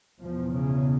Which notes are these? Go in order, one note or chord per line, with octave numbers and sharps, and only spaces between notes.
E2 B2 F3
C#3